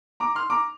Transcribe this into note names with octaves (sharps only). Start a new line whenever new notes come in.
A#5 D6
C6 F6
A#5 D6